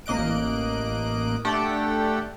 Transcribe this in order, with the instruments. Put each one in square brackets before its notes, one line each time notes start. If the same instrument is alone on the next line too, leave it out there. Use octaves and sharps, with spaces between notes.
[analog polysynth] A1 A#3 D#5 F#6 D7
A3 D4 G4 A4 F#5 G5